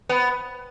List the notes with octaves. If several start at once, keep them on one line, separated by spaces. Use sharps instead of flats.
B3